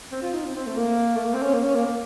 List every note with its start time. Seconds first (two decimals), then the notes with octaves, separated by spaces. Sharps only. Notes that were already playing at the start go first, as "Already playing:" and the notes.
0.12 C4
0.22 F4
0.33 D#4
0.45 C4
0.55 C4
0.66 A3
0.77 A#3
1.16 A3
1.24 A#3
1.34 C4
1.42 C#4
1.54 A#3
1.64 C#4
1.75 A#3
1.86 A#3